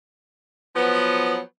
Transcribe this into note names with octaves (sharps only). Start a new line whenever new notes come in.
F3 F#3 B3